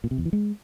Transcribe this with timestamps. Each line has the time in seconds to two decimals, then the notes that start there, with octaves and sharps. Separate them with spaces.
0.04 A#2
0.11 C3
0.18 E2
0.25 E3
0.33 G#3